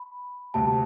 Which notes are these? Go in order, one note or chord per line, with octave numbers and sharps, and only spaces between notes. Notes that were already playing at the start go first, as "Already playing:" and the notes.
Already playing: B5
D2 C3 G3 A5